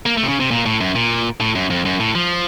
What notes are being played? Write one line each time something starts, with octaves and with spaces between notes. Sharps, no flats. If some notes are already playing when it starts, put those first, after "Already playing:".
A#3
A3
C3
C#3
C3
A#2
A2
F#2
A#2
A2
F#2
F2
F#2
A2
F3